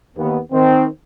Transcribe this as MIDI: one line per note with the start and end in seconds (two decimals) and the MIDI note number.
0.17 0.39 39
0.17 0.39 59
0.52 0.86 51
0.52 0.86 60